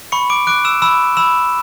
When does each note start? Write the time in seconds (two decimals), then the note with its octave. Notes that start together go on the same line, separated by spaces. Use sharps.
0.12 B5 C#6 C#7
0.30 D6 D7
0.47 D6 F#6 D7
0.65 E6 E7
0.82 B5 E6 E7
1.17 B5 E6 E7